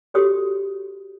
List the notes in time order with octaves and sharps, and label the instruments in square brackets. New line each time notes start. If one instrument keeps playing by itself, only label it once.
[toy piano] F#4 G4 A4 C#5 C6 D#6